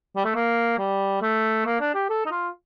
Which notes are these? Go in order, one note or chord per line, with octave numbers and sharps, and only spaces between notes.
G3
A3
A#3
G3
A3
A#3
D4
G4
A4
D#4
F4